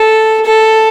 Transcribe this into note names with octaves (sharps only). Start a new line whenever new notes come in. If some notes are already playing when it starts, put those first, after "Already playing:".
Already playing: A4
A4